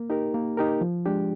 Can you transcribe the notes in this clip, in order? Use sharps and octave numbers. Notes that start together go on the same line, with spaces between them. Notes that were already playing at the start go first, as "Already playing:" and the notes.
Already playing: A#3
D#4 G4 A#4
A#3
D#4 G4 A#4
F3
G#3 D4 G4